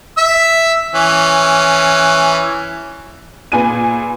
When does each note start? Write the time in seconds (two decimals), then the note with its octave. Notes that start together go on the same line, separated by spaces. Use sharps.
0.17 E5 E6
0.95 E3 C#4
3.52 A#2 G#4 B4 G#5 D#7